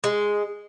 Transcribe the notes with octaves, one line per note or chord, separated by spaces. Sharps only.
G#3